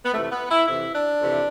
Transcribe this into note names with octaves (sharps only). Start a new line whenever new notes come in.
B3
F2 C3 E3 A3
A3
B3
E4
F2 C3 E3 E4
D4
F2 C3 E3